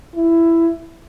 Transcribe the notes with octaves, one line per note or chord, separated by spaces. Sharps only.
E4